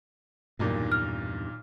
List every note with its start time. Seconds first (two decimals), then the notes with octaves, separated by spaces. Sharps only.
0.59 B1 E2 G2 A#2 D#3
0.92 F6